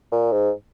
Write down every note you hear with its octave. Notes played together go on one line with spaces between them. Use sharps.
A#2
G#2